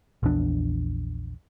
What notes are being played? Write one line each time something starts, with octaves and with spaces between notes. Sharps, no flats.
A#1 E2 D4